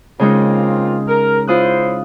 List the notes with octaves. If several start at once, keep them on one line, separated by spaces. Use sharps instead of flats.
C#3 G#3 A#3 C4 D#4 F4
A#4
C#4 E4 F4 C5 D#6 F#6